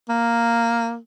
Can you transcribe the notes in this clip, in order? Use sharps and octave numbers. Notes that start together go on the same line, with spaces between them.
A#3